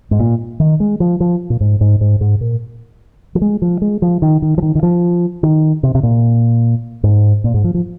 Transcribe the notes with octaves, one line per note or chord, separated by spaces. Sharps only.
G#2
A#2
D#3
G#3
F3
F3
A#2
G#2
G#2
G#2
G#2
A#2
F3
G#3
F3
G#3
F3
D#3
D#3
F3
D#3
D#3
F3
D#3
C3
C3
A#2
G#2
A#2
G#2
F3
F3